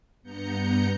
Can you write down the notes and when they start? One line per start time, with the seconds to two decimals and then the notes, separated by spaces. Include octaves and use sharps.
0.23 G2 B3 A#5 G6 C#7